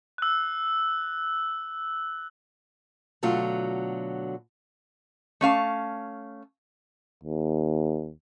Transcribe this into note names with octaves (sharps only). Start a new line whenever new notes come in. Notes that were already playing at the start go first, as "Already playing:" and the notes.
E6 F#6
B2 D3 F#3 A3 F4
A3 C#4 F5 A5
D#2